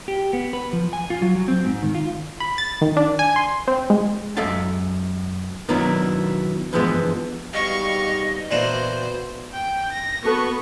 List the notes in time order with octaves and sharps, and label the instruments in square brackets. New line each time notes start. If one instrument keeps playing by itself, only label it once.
[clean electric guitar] G4
B3
B4
F3
G#5
F4
F#3
F#3
C4
G#2
D#3
F4
[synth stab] B5
A6
D#3
D4
G#5
C6
C4
G#3
[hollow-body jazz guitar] F#2 G#3 A4 E5 F5 A5
B2 D#3 F#3 B3 D4 E4
G2 E3 F3 G#3 B3
[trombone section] G#2 B2 G3 [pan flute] D#5 [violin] F5 C#6
[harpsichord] A#2 E3 D4 [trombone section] B3 F#4 [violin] C5
[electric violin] G5
A#6
[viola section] B3 [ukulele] F#4 A4 B4 [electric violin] C#6